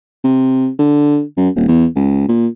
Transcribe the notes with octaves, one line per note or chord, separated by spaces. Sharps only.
C3
D3
F#2
D#1
E2
C#2
A#2